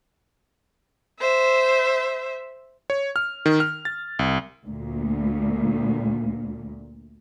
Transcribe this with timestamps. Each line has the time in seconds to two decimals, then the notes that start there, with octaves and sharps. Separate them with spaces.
1.20 C5 E5
2.90 C#5
3.16 F6
3.46 D#3
3.60 F6
3.85 A6
4.19 C2
4.66 D2 A#2